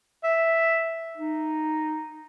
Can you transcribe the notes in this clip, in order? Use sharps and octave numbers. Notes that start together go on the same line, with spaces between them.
E5
D#4